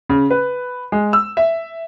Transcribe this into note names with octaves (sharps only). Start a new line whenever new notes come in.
C#3
B4
G#3
E6
E5